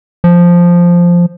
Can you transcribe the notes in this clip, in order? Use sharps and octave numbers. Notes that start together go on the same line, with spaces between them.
F3